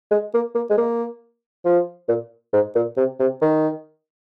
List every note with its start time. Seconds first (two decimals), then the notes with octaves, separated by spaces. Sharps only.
0.11 G#3
0.34 A#3
0.55 A#3
0.70 G#3
0.78 A#3
1.65 F3
2.09 A#2
2.53 G#2
2.75 A#2
2.97 C3
3.20 C3
3.42 D#3